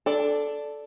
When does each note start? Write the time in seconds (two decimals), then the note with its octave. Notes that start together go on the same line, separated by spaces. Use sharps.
0.06 D4 A4 D5